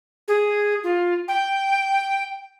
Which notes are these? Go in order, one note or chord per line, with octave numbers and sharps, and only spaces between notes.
G#4
F4
G5